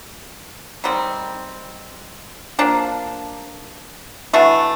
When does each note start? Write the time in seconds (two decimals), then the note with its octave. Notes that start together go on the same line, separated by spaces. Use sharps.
0.84 D#3 G3 C4
2.59 F3 A#3 D4
4.33 E3 A3 D4 F#4